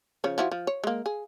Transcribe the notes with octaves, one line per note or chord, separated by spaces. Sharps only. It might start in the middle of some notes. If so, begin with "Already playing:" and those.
C#3 F3 C#5
F3 E4 F#4
F3
C#5
G#3 A#3
G#4